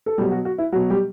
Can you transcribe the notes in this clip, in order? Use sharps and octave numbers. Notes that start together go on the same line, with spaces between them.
A4
B2 F#3 G3 G4
F#4
F#4
E4
B2 F#3 F#4
G3 G4